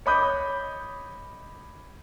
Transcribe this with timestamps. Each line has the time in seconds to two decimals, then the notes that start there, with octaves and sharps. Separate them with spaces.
0.06 C#5 D#5 B5 D6 D#6 G6